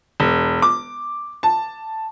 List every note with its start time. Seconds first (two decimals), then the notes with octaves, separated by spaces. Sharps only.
0.20 E1
0.62 D6
1.43 A5